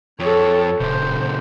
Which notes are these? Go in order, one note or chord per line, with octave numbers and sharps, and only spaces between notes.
F2 A4 C#5
D1 A#2 C#3 C5